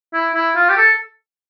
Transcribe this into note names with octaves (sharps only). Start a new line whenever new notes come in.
E4
E4
F4
G4
A4